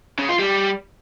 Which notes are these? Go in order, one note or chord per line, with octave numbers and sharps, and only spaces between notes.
C#3
F4
G3